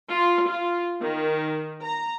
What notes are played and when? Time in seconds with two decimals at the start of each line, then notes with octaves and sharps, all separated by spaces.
0.10 F4
0.47 F4
1.01 D#3
1.82 A#5